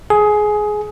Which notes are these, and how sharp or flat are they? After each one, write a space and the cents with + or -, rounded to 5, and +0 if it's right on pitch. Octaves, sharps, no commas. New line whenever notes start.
G#4 +15